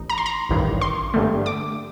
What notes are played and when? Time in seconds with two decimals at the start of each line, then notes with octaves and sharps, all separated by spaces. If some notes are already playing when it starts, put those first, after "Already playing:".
Already playing: A1 D#4
0.10 A#5
0.18 C6
0.26 A#5
0.49 A1 G2 D#3
0.81 C6
1.14 G2 D3 A3
1.46 D6